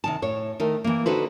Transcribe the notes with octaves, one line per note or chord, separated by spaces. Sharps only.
C3 D#3 A5
A2 C#5
D#3 A3 A#4
E3 A#3
D3 D#4 F#4 A4 B4 C5